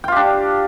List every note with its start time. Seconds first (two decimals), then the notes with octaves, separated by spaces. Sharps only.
0.04 G5
0.08 F4
0.12 G4
0.16 D4